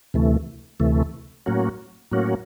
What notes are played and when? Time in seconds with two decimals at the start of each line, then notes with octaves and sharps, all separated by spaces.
0.14 D2 C3 E3 A3
0.80 D2 C3 E3 A3
1.46 A2 F#3 A#3 C#4 F#4
2.12 A2 F#3 A#3 C#4 F#4